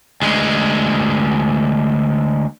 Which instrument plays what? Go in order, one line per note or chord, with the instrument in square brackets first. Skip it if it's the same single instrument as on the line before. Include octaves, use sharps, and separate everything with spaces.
[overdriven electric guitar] D2 G#3